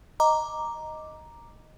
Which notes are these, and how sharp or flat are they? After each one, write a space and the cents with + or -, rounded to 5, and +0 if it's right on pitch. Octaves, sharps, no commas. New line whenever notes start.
D#5 +0 A#5 +0 D6 +0